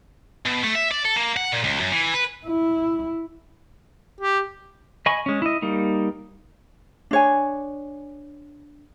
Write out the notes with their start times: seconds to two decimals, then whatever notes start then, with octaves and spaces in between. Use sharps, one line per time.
0.46 B2
0.64 A3
0.75 E5
0.91 D5
1.05 A4
1.16 A#3
1.37 F#5
1.52 A#2
1.64 C#2
1.80 F#2
1.92 E3
2.14 B4
2.46 E4
4.21 G4
5.06 D#5 G#5 B5 C#6
5.26 G#3 C#4
5.42 E4 D#5
5.62 G3 A#3 D#4
7.11 D4 C#5 G#5